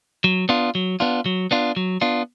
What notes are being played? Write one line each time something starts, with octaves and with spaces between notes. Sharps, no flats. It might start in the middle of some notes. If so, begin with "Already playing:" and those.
F#3
B3 D4 F4
F#3
B3 D4 F4
F#3
B3 D4 F4
F#3
B3 D4 F4